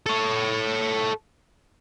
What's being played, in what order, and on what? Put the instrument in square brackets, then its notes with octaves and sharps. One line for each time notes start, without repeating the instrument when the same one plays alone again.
[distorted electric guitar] A4 C#5